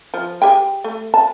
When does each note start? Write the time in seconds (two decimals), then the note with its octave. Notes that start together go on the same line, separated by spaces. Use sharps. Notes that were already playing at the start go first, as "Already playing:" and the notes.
0.14 F3
0.42 G4 G#4 G5
0.84 A3
1.14 A5